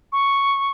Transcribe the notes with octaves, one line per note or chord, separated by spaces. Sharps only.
C#6